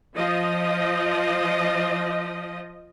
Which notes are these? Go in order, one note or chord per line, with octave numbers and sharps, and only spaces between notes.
F3 D#5